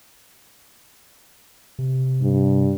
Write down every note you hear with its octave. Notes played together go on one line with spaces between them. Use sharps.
C3
G2